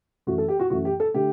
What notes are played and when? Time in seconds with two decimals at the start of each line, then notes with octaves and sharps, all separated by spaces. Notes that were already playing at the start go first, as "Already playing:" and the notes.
0.27 F#2 E3 A3 F#4
0.38 A4
0.48 G4
0.60 F#4
0.70 F#2 E3 A3 F#4
0.85 G4
1.00 A4
1.14 D3 A3 G4